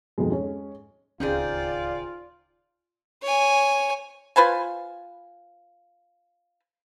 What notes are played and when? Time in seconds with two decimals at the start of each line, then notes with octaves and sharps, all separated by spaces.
0.18 F2 G#2 B2 G#3
0.30 G#3 C#4
1.20 D1 C#2 D#3 C4 C#4 F4 G#4 D5
3.22 C#5 G#5
4.36 F4 B4 C5 G#5